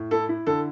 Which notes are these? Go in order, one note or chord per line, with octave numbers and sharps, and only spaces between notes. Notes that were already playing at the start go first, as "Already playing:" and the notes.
Already playing: A2
E4 A4
E4
D3 A4